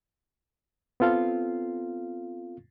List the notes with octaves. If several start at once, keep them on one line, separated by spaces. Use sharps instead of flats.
B3 C4 F4 A4 F5